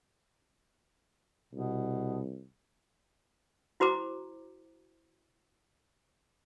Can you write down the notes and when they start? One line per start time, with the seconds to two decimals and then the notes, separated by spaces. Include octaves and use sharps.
1.53 C2 B2
3.80 E4 F#4 C5 A#5 D6